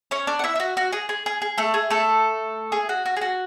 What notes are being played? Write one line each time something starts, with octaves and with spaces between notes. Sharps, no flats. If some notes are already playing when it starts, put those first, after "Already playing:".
C#4 C#5
D4 D5
F#5
E4 E5
E4
F#4
F#4
G#4
G#4
G#4
G#4
A3 A4
G#4
A3 A4
G#4
F#4
F#4
G#4
F#4